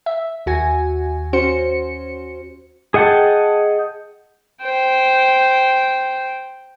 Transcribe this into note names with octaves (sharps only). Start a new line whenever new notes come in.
E5
D#2 F#4 G#5
C#4 F#4 C5 C#7
G#4 D#5 F#5 G5 A5
C5 G5